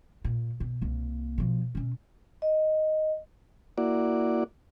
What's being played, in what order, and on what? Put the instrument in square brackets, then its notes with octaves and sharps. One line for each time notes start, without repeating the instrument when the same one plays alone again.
[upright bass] A#2
B2
C2 A#3
B2 F3
B2 C#4
[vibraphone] D#5
[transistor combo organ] A#3 E4 F#4 D5